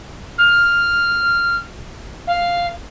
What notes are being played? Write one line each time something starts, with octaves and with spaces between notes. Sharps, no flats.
F6
F5